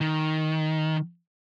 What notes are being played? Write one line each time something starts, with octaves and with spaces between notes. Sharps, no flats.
D#3